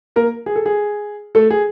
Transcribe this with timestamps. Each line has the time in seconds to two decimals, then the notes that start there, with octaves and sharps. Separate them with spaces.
0.16 A#3 A#4
0.46 G#4
0.56 A4
0.66 G#4
1.35 A3 A4
1.50 G#4